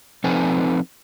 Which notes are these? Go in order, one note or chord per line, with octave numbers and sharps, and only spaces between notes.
F3 C4 D#4 A4 B4 G#5